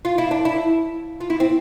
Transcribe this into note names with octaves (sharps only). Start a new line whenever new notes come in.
F4
E4
D4
E4
F4
E4
C4